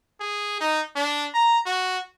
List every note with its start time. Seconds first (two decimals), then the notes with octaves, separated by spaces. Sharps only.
0.20 G#4
0.60 D#4
0.95 D4
1.34 A#5
1.66 F#4